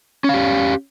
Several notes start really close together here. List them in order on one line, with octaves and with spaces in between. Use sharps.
C#4 F5 G4